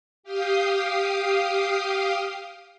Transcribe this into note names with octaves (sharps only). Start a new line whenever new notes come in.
G4 F5 G5 D#6 C7